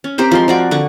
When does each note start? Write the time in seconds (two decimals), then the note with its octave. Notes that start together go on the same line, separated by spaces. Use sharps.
0.04 C#4
0.18 C4 G4 A#4 C5
0.32 F3 G#3 C6
0.48 F3 F#4 D5
0.71 D3 F#5 C#6